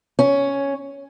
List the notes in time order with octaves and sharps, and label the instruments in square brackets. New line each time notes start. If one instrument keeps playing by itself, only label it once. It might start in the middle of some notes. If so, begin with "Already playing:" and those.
[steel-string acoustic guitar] C#4